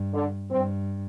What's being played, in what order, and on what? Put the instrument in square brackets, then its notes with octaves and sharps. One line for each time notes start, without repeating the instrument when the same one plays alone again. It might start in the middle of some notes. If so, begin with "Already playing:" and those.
Already playing: [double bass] G2
[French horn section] D3
[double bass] G2 [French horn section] C4